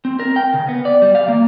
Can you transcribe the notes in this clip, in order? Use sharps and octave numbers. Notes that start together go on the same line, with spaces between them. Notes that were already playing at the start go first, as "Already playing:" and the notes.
C4
A#4
G5
C#3
B3
D5
G3
F5
A#3